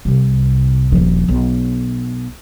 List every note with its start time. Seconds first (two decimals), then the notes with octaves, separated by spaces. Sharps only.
0.05 C2 C3
0.92 D#1 F3
1.28 B1